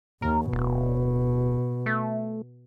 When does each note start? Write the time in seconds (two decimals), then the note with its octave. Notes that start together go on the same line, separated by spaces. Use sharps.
0.22 D#2 A#4
0.53 D1 B2
1.86 A3